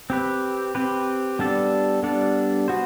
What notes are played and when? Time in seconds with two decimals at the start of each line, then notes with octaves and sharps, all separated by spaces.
0.10 C4 G4 B4
0.75 C4 G4 B4
1.39 G3 B3 D4 A4 D5
2.03 G3 B3 D4 A4 D5
2.68 B3 F#4 C5